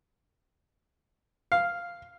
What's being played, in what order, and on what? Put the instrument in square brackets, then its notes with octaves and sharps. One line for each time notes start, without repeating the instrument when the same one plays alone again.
[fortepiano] F5